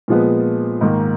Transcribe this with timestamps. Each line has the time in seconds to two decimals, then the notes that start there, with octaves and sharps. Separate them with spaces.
0.08 A#2 F3 G#3 B3
0.81 G#2 D#3 A#3